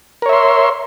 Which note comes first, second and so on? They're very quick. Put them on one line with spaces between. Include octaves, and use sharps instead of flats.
A#4 C#5 E5 C6